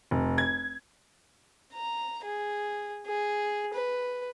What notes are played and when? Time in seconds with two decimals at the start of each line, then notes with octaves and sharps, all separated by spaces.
0.11 F1
0.38 G#6
1.74 A#5
2.24 G#4
3.06 G#4
3.74 B4